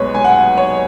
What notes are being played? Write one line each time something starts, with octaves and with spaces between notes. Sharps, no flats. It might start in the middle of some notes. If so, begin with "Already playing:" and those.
Already playing: B1 B2 G#3 B4 C#5
G#5
F#5
C#5